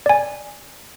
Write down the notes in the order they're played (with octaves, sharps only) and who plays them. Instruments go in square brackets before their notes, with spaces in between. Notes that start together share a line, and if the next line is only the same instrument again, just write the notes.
[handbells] D5 G#5